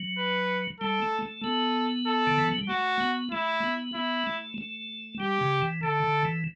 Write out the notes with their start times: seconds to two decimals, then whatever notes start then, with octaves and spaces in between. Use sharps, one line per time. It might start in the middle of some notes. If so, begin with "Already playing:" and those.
Already playing: F#3
0.18 B4
0.80 G3 A4
1.02 A3
1.23 A3
1.43 B3 A4
2.06 A4
2.27 D3
2.38 E3
2.48 F#3
2.58 G3
2.69 A3 F#4
3.00 B3
3.31 A3 E4
3.64 B3
3.95 B3 E4
4.27 A3
4.58 A3
5.20 G3 G4
5.41 C#3
5.62 E3
5.83 D3 A4
6.04 D3
6.25 E3